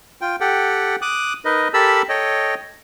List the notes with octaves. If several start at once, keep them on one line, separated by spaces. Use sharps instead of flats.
F4 G5
G4 A4 F#5 G5
D6 D#6 F#6
D#4 A#4 B4 D#5
G4 A4 A#4 A5 B5 E6
A4 C#5 D#5 G5